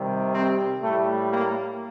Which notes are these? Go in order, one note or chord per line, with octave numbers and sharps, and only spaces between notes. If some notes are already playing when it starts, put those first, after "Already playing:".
Already playing: C3 D#3 G3
C4
A2 G3 A3
A#3